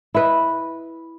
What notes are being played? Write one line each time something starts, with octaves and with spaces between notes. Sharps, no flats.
E4 B4 D#5